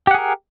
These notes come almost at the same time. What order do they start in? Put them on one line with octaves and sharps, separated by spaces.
G4 F#5 G#4 A#4